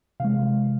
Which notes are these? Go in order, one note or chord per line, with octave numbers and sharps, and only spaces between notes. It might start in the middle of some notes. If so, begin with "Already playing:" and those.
C3 E3 G#3 F5